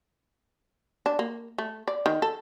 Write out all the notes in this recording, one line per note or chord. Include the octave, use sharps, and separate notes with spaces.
D4
A#3
A3
D5
D#3
A4